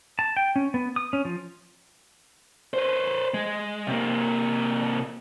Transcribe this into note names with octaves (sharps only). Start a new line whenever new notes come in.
A5
G5
C#4
B3
D#6
C#4
F3
B4 C5
G#3
C3 A#3